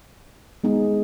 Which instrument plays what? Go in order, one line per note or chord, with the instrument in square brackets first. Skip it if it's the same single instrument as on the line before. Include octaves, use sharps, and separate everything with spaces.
[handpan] G#3 B3 D#4 G#4